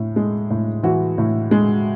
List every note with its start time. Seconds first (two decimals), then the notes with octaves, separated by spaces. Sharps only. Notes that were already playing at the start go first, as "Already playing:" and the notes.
Already playing: A2
0.16 G#3
0.50 A2
0.83 E3 F#4
1.18 A2
1.51 G#3